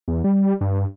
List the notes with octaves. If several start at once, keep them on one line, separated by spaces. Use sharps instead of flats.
E2
G3
G2